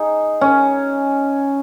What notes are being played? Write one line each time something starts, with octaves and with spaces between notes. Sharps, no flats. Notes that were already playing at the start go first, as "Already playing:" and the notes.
Already playing: D#4 G#4
C#4